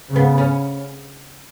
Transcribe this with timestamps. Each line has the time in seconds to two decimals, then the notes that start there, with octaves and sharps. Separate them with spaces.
0.08 C#3
0.16 B3
0.38 C#4